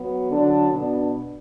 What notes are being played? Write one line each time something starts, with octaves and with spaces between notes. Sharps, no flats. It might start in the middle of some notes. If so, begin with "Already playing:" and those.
Already playing: F#3 B3
D3 F#3 D4 A4
B2 B3 D4